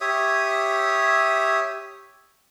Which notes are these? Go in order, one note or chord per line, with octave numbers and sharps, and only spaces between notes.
G4 C#5 E5 D#6